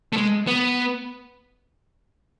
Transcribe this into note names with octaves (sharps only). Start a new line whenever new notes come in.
A3
G#3
B3